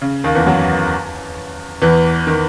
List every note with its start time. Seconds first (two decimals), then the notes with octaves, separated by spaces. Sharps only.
0.02 C#3
0.24 D#2 D#3
0.35 E2 E3
0.47 F#2 F#3
1.82 E2 E3
2.27 D#3